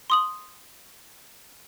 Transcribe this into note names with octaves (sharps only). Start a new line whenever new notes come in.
C6 D#6 F#7